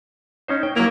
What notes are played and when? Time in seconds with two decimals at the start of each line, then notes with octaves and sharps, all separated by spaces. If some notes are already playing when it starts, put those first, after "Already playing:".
0.48 C#4 D#4 C5
0.63 G5
0.76 F#3 A#3 E4